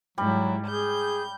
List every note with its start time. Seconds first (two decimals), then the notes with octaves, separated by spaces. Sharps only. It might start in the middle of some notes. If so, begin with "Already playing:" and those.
0.18 G#2 F#3 G3 E4
0.66 G#4 G6